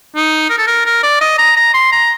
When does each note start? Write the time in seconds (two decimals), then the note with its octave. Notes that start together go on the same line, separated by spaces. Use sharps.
0.15 D#4
0.50 A#4
0.58 A4
0.67 A#4
0.86 A#4
1.03 D5
1.21 D#5
1.38 A#5
1.56 A#5
1.74 C6
1.92 A#5